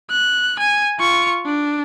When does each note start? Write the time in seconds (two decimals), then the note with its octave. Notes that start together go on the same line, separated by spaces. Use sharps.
0.10 F#6
0.59 G#5
0.99 F4 C#6
1.46 D4